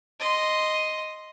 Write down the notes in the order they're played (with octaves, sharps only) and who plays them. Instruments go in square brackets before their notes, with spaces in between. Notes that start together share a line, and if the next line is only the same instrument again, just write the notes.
[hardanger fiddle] D#5 C6